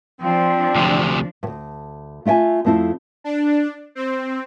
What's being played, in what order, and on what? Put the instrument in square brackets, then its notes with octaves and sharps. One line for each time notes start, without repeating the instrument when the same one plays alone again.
[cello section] F3 D4 [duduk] C4
[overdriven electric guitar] D2 C3
[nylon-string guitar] D2 G2
A3 F4 E5 G5 G#5
F2 A3 C4 E4 C5
[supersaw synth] D4
C4